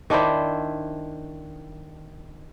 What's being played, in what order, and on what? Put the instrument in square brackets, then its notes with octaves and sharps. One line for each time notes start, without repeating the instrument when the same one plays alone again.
[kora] D#3 D4 E4 C5